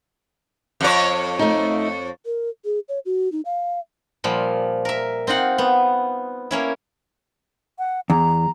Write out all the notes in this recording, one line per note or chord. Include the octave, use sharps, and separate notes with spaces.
F2 C#5
A3 D#4
A#4
G#4
C#5
F#4
D#4
F5
A#2 F3 G3
A#4 E5
C4 D#4 F4 F#5
B3
A#3 C#4 E4
F#5
E2 A#5